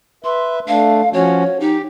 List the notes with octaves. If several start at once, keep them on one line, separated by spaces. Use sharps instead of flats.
B4 E5 C6
A3 D4 F5
F3 C#4 F#4 C#5
D#4 G4